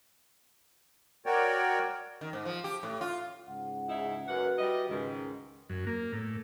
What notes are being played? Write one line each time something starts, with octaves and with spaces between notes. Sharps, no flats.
F#4 A#4 C#5 D5 G5
D#3
G#2
F3
G4
A2
F4
C#2 G#2 F#5
C#3 D#4 E4
F#2 A#3 F#4 B4 F#5
G3 E4 D#5
C#2 G#2 D#3
F#2
A#3
A2